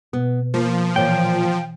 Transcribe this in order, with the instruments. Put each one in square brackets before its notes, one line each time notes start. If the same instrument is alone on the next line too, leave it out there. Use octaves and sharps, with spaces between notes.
[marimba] B2 [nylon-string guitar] B3
[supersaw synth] F3 [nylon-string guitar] A#3
[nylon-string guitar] A#2 A#3 [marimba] E3 C#5 [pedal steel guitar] G5